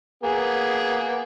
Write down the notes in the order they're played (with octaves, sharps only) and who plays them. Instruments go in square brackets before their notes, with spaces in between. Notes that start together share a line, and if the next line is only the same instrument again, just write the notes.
[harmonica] A#3 B3 G#4